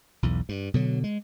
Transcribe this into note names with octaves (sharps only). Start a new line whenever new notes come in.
B1 E2
G2
B2 D3 F#3
G#3